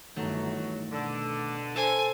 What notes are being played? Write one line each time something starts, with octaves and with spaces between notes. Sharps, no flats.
G1 D#3 E3 F#3 A3
B2 D3
A4 C5 G#5